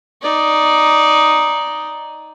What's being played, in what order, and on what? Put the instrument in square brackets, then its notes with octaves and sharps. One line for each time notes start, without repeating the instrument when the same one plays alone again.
[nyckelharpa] D#4 D5